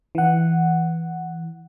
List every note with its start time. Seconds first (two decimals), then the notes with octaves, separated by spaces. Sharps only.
0.15 E3 F#5